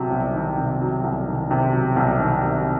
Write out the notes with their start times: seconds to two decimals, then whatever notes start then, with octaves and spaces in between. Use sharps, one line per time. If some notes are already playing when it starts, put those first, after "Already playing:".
Already playing: C2 C3 F#3
0.11 C2
0.34 D#3
0.58 C3
0.81 F#3
1.04 C2
1.28 D#3
1.51 C3
1.73 F#3
1.96 C2
2.20 D#3
2.43 C3